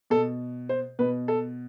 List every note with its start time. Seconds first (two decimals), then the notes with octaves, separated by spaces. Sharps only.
0.10 B2 A4
0.69 C5
0.99 B2 B4
1.28 A4